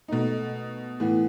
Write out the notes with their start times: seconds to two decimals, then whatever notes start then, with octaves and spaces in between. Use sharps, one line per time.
0.08 B2 A3 D#4
1.00 A2 E3 B3